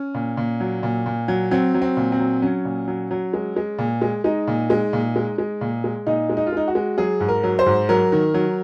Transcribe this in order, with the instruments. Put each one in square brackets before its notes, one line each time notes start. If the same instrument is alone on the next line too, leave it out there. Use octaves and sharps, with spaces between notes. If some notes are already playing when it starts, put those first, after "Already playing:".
Already playing: [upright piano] C#4
A#2
A#2
F#3
A#2
A#2
F#3
F#3 C4
F#3
C4
A#2
C4
F#3
F#3 C#4
A#2
F#3
F#3
G#3
G#3
A#2
G#3
G#3 D#4
A#2
G#3
A#2
G#3
G#3
A#2
G#3
A#2 D#4
G#3
D#4
F4
G#3 D#4
F#4
G#3
F#3 G#4
G#2
A#4
F#3
C5
G#2
F#3 A#4
D#3
F#3